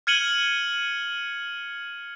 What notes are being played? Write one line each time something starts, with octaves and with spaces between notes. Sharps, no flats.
F6 G#6 C#7 D#7 F#7 G7